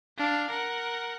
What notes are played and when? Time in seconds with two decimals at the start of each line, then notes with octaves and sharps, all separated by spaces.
0.17 D4 F5
0.50 A#4 F#5